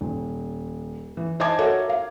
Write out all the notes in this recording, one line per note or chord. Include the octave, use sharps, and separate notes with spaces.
D#1
E3
C5 D#5 G#5 A5 D6 G#6
F#4 A4 A#4 C#5 E5
F5